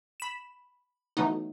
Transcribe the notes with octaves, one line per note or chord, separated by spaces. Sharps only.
B5 E7
E3 F#3 A3 B3 D#4